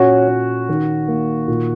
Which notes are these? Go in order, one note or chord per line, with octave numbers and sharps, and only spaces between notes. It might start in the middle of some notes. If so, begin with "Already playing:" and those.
Already playing: A#2 C#4 F#4
C#4
D#3
A#3
A#2